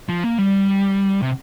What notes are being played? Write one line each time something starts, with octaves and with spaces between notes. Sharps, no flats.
F3
A#3
G3
C3